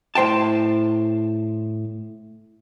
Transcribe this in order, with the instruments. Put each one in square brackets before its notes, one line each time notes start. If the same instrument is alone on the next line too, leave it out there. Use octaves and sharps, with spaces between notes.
[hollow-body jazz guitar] A2 C5 G5 A5